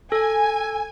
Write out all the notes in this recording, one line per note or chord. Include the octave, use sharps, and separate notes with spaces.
A4 G#5